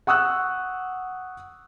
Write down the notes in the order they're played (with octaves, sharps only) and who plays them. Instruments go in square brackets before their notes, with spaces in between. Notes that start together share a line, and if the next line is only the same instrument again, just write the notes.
[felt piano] F#5 C#6 D#6 E6 F#6